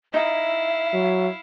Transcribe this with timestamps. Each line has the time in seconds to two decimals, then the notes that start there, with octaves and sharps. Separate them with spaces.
0.14 D#4 E4 E5 F5
0.93 F#3